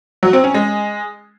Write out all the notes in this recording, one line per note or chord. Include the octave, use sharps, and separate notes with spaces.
F#3
C4
C#4
G#3